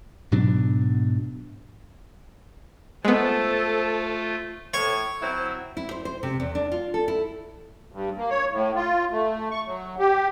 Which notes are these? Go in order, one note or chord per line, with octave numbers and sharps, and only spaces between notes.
G#2 B2 F#3 D4
G#3 A3 B3 F4 A4 C5 A5
A2 C#5 C#6
F#3 C4 E4
E4
C5
C5
C3
E2
D4
F4
A4
E4
G2
A#3
C#5
A2
F4
A3
C#6
F#3
G4